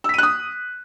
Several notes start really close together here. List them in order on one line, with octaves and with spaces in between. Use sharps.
E6 B6 D#7 F#6 D#6